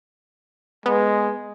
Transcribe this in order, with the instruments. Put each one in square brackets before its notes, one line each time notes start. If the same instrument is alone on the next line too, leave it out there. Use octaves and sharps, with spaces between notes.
[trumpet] G#3 [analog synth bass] B3